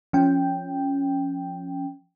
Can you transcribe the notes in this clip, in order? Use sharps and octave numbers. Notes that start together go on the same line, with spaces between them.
F3 C#4 G5